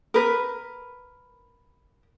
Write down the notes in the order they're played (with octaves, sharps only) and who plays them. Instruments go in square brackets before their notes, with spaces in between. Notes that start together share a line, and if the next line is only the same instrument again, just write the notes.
[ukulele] A#4 B4